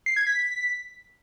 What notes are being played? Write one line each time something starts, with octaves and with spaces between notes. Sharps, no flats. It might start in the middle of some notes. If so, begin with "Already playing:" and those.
C7
G#6
B6